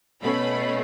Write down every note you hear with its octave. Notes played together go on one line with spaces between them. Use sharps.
B2 A3 C#4 B5